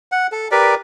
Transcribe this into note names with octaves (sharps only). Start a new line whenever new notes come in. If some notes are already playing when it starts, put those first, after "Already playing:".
F#5
A4
G4 A#4 B4 D5